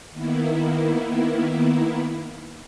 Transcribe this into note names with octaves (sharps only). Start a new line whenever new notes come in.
D#3 A#3 B3 E4